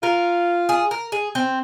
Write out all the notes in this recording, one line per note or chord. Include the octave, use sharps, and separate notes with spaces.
F4 A#4
G#4
A#4
G#4
C4